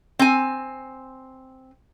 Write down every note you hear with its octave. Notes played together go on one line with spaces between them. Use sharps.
C4 G#5